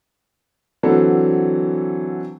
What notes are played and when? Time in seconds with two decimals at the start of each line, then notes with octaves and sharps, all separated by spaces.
0.83 D3 E3 F#3 C4 A4